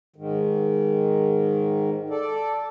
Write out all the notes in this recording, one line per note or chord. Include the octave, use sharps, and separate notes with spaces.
G#2 D#3
A4 D5